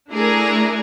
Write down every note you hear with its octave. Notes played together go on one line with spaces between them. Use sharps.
A3 D4 E4 G#4 A#4